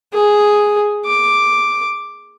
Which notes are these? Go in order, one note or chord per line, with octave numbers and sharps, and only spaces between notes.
G#4
D6